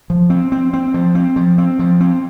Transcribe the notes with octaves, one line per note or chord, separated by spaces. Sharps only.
F3
C4
C4
C4
F3
C4
F3
C4
F3
C4